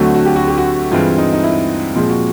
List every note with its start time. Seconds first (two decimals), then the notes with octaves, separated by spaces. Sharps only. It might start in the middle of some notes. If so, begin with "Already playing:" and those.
Already playing: D2 D3 F#3 A3 C4 F#4
0.14 F#4
0.25 G4
0.36 F#4
0.48 G4
0.58 F#4
0.92 G2 E3 G#3 C4 F4
1.18 D#4
1.33 D#4
1.43 E4
1.95 A#2 F3 G#3 C4 F4
2.09 F#4